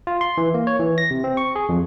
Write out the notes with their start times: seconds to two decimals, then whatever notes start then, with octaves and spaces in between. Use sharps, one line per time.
0.07 F4
0.21 C6
0.38 E3
0.54 A#3
0.67 C#5
0.80 E3
0.98 A#6
1.11 C3
1.24 C4
1.37 C#6
1.56 G#4
1.69 F2